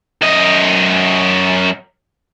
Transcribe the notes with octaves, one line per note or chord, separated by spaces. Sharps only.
F#2 D#5